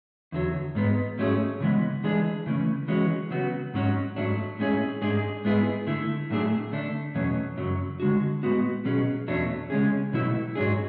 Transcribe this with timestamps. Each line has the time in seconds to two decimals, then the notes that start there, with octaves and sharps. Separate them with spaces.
0.32 E2 D3 F#3
0.75 G#2 G#3 B3
1.18 G#2 F#3 A3 C#4 G#4
1.60 C#3 E3 G#3 B3
2.04 E3 G#3 D4 G#4
2.46 C#3 E3 A3 C#4
2.88 E3 G#3 C#4 F#4
3.31 C#3 F#3 B3 F#4
3.74 G#2 F#3 C#4 F#4
4.16 G#2 F#3 A3 D4
4.59 A2 G#3 C#4 E4 G#4
5.02 G#2 G#3 D4 G#4
5.44 G#2 G#3 B3 E4 G#4
5.87 D3 A3 E4
6.30 A2 F#3 A3 D4 G#4
6.72 D3 A3 D4
7.15 E2 B2 F#3 A3 C#4
7.57 F#2 C#3 F#3
8.00 D3 G#3 D4 F#4
8.43 A2 G#3 B3 F#4
8.85 B2 F#3 C#4 G#4
9.28 E2 B2 F#3 A3 D4
9.70 C#3 G#3 C#4 G#4
10.13 B2 F#3 A3 E4
10.55 G#2 F#3 B3 D4 G#4